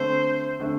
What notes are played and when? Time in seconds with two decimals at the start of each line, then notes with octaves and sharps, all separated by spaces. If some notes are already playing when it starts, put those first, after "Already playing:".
Already playing: D3 A3 C4 C5
0.60 D3 A3 C4